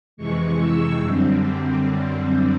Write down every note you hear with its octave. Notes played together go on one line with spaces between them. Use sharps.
F2 C3 E3 G#3 C#6
E6
F#2 D3 G3 C4